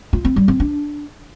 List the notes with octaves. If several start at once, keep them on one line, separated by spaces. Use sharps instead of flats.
F4
C4
G3
C4
D4